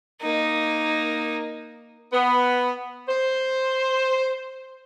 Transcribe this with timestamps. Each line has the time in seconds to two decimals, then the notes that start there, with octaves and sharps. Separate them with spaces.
0.21 A#3 D#4
2.13 B3
3.08 C5